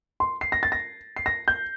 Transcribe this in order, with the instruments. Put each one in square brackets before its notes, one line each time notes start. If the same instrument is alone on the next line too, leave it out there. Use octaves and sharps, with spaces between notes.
[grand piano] C6
C7
A#6
A6
A#6
C7
A#6
G6